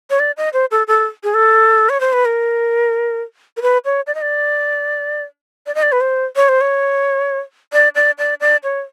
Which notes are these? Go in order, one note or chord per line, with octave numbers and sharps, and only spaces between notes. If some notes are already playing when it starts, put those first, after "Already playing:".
C#5
D5
D#5
C5
A4
A4
G#4
A4
C#5
C5
B4
A#4
A#4
B4
C#5
D5
D#5
D5
D5
D#5
D5
B4
C5
C#5
C5
C#5
D5
D5
D5
D5
C#5